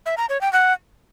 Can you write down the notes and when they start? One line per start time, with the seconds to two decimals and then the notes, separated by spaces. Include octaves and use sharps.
0.06 E5
0.18 A#5
0.29 C#5
0.41 G5
0.53 F#5